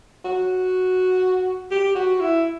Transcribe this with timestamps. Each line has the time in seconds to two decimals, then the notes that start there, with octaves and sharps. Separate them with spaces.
0.25 F#4
1.71 G4
1.95 F#4
2.20 E4